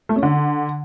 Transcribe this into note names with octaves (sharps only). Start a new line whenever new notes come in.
A3
C#4
D3